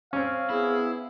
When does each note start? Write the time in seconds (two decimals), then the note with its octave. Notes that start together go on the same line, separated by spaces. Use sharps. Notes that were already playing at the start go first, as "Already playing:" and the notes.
0.13 C4 C#4 F5
0.50 B3 E4 G#4